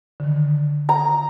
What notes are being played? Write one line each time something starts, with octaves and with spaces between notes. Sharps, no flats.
D3 D#3
A#5